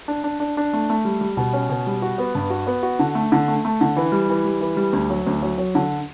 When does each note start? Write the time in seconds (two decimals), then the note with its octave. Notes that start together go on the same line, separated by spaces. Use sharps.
0.08 D4
0.24 D4
0.40 D4
0.57 D4
0.73 A3
0.90 A3
1.05 G3
1.21 G3
1.37 B2
1.53 C#4
1.70 B2
1.87 G3
2.02 F#4
2.18 B3
2.35 G2
2.50 F#4
2.67 B3
2.83 F#4
2.99 D3
3.15 A3
3.32 D3
3.48 A3
3.65 A3
3.81 D3
3.96 E3
4.12 G3
4.29 E3
4.45 G3
4.61 E3
4.77 G3
4.93 D2
5.10 F#3
5.27 D2
5.42 F#3
5.58 F#3
5.75 D3